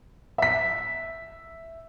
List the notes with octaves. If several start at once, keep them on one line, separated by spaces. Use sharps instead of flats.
E5 B6